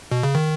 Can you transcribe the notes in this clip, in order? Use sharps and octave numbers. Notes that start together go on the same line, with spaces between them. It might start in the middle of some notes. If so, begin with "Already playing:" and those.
B2
C#3
D#3